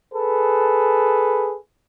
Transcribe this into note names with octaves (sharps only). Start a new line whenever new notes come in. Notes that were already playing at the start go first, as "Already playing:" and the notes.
G#4 A4 B4